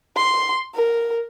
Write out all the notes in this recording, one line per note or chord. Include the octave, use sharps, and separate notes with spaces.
C6
A#4